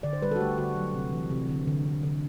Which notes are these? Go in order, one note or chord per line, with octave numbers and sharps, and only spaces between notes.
D3 D5
C5
G3 B4
F#4 A4
A3 G4
D3 F#4
F#3
C3
E3
C3
D3
D3
D3
D3